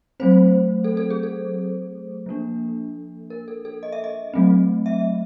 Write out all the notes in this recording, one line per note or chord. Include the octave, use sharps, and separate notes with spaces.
F#3 A3 C4 C5
A4
A4
G#4
A4
F3 A#3 D4
A#4
A4
A4
D#5
E5
D#5
F#3 A3 C4
E5